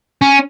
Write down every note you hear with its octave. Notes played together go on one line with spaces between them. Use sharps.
C#4